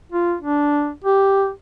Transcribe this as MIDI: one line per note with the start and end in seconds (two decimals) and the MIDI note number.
0.12 0.34 65
0.41 0.91 62
1.04 1.50 67